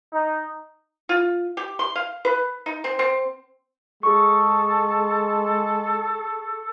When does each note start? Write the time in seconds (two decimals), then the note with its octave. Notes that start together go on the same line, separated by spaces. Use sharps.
0.13 D#4
1.09 F4
1.57 G4
1.79 C6
1.96 F5
2.25 B4
2.66 D#4
2.84 C4
2.99 C4
4.03 G#3 G#4 A4 C#6